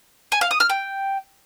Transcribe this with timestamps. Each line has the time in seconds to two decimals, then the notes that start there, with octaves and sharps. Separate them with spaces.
0.32 G#5
0.41 F5
0.51 D#6
0.60 F6
0.70 G5